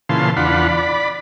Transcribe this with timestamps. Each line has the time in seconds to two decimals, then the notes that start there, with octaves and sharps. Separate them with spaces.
0.09 A#2 C#3 E3 F5 A5 C6
0.37 E2 D4 F4 F#5 B5
0.69 D5 B5